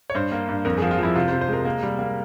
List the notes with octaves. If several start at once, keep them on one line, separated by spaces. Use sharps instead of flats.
C#5
G2 C5
A#3
G2
F2 A#4
G#4
F3
F4
F3 E4
C3 F4
C5
C3
C5
G#3 A#4
A#3
G3
A#3